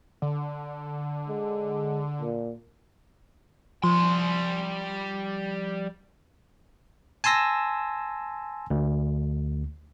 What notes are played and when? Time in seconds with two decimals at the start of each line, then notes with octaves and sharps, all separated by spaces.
0.22 D3
1.28 G#3
2.21 A#2
3.84 F3 G3 C6
7.24 G#5 A5 C6 E6 A#6
8.70 D2